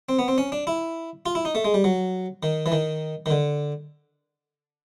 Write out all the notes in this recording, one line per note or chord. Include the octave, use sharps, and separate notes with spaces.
C4
B3
C4
C#4
D4
E4
F4
E4
D#4
A3
G#3
G3
F#3
D#3
E3
D#3
D#3
D3